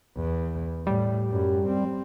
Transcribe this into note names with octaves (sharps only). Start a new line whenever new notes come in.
E2
A2 G3
F#2
C4